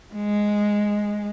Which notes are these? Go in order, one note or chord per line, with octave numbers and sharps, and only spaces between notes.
G#3